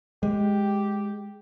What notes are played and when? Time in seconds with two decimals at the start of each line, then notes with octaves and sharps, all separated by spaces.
0.23 G#3 G4